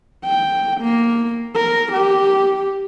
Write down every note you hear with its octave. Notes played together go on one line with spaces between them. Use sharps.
G5
A#3
A#4
G4